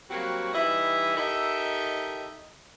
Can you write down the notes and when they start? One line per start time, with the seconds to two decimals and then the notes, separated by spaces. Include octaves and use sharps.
0.10 F#3 G3 A#3 C4 F#4
0.53 E3 G3 D#4 D#5 E5
1.15 D#4 G4 A4 A#4 D#5 E5